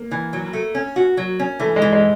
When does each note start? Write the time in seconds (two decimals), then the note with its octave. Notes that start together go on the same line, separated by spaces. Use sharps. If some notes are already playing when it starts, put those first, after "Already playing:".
Already playing: A#3
0.11 E3
0.33 F#3
0.53 A3
0.75 C#4
0.96 F#4
1.17 F#3
1.39 C#4
1.60 E3 A3
1.76 G#3
1.82 E3
1.93 G#3